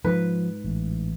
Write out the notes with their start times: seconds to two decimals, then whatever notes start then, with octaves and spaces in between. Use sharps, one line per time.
0.05 G#2 F3 B4
0.64 A1